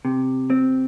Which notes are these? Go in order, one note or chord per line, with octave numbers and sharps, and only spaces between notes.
C3
C4